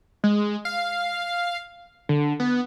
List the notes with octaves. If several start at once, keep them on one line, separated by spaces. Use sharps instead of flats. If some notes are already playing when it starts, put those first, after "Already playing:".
G#3
F5
D3
B3